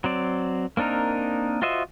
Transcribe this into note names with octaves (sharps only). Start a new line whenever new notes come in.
F#3 C4 D5
A#3 C4 D4 D#4 A#4
F4 F#4 C5 D#5 E5